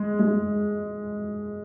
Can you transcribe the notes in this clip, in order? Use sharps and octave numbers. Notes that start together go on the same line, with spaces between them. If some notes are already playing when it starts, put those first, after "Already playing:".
Already playing: G#3
G#3